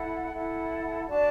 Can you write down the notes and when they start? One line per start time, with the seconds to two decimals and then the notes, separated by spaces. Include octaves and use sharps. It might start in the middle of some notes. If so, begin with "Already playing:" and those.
Already playing: E4 A4 F#5
0.33 E4 A4 F#5
1.07 D4 F#4 D5 A5